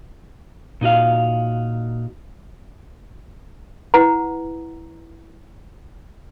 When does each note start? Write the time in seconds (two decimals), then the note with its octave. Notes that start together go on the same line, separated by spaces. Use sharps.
0.81 A#2 D#4 F#4 F5
3.94 E4 B4 F#5 A#5